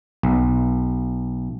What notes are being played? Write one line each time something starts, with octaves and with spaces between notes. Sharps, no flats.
B1